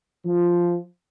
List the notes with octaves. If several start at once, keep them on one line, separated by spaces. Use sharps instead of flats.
F3